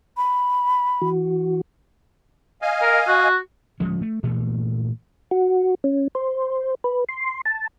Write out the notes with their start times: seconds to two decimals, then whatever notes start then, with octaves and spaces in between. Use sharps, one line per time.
0.17 B5
1.02 E3 F#4
2.62 D#5 F5 G#5
2.82 A#4
3.08 F#4
3.80 D1 F3 G#3 C#4
4.02 A3
4.23 G2 A#2 E3 A3
5.31 F#4
5.84 C#4
6.15 C5
6.84 B4
7.09 C6
7.46 A5